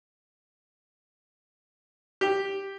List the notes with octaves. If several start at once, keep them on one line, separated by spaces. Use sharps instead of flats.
G4